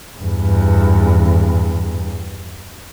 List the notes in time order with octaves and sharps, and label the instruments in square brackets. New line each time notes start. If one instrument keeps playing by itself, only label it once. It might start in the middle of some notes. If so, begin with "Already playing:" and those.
[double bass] E2 G2